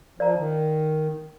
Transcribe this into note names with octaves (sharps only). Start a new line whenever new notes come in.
F3 A#4 D5 F5 A#5
D#3